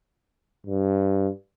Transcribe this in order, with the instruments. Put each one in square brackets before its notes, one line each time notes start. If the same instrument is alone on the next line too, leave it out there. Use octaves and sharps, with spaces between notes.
[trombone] G2